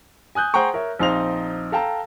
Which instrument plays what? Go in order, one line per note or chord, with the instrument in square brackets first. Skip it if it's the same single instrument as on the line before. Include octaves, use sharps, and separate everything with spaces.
[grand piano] G#5 D#6 F#6 G6
G#4 C5 F#5 G5 A#5 C#6
A#4 C#5 E5
A#1 C4 D#4 C5 F5 F7
A4 F5 G5 A5 A#5